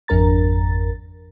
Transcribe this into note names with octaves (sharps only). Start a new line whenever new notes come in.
G#1 F2 D4 A#4 A#5 A6